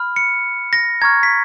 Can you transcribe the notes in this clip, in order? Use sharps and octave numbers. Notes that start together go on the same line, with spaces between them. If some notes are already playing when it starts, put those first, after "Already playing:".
Already playing: B5 F6
C#7
A#6
A#5 C#6 F6 G#6
B6